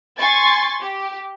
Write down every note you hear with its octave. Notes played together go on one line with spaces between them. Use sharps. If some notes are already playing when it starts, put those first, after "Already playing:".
G#5 C6 C#6 A6
G4